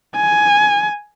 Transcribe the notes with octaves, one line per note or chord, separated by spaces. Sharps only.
G#5